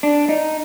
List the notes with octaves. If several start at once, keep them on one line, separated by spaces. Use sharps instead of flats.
D4
D#4